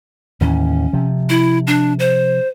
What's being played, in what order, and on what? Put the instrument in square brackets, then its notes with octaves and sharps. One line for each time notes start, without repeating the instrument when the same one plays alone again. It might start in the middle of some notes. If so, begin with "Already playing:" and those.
[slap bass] D#2 A2 E3 [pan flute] C#4
[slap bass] C3 F3
[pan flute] E4
D4
C5